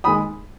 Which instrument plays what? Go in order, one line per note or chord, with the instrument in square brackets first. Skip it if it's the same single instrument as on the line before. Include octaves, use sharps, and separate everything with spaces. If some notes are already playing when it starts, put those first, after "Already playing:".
[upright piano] D#3 G#3 B5 D#6